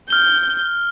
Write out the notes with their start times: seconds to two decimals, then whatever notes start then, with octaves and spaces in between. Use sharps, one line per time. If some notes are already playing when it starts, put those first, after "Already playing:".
0.10 F6 G6 G7